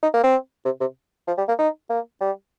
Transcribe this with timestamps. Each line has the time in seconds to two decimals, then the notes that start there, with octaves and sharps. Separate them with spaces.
0.03 D#4
0.14 A#3
0.23 C4
0.65 C3
0.80 C3
1.27 F3
1.38 G3
1.48 A#3
1.59 D#4
1.90 A#3
2.21 G3